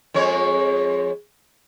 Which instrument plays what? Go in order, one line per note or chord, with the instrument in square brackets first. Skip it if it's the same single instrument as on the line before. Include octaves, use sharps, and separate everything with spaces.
[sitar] F2 G#3 C#5